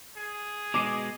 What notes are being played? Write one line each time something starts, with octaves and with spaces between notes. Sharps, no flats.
G#4
B2 G#3 D6 C7 D#7